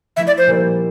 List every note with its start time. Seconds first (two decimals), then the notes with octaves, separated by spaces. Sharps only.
0.17 F3 A3 E4 E5
0.27 D5
0.38 C5
0.47 A#2 G3 A#3 E4